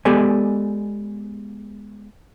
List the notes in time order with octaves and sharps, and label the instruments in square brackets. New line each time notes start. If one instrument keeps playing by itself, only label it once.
[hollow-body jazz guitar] G#3 B3 G4 A4 D5 G#5